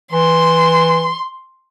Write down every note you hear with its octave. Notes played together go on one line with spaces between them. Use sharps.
E3 C6